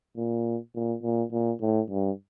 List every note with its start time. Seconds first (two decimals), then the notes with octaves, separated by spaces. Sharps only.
0.17 A#2
0.75 A#2
1.03 A#2
1.32 A#2
1.61 A2
1.90 G2